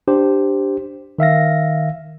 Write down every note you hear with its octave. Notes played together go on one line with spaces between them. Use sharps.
D4 G4 C5
D#3 E5 F5 A#6